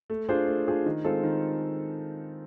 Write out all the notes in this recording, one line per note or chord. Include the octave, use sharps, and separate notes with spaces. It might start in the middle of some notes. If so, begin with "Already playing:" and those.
A3
D4 F4 G#4 C5
A3
D4 F4 G#4 C5
D#3
G#3 C4 F4 A4
D#3